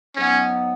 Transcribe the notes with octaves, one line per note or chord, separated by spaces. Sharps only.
G#2 F#3 B3 C#4